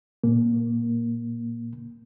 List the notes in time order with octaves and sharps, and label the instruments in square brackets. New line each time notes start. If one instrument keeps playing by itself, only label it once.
[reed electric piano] A#2 A#3